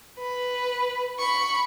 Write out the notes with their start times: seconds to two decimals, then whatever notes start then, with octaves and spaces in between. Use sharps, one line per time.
0.19 B4
1.19 B5 C#6